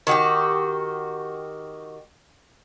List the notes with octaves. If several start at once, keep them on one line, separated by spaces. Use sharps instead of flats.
D#3 F#4 G4